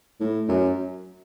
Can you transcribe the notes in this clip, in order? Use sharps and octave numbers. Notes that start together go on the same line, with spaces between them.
A2
F#2